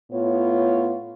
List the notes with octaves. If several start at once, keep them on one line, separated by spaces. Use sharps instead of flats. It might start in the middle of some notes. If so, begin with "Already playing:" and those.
A2 B3 F4 C#5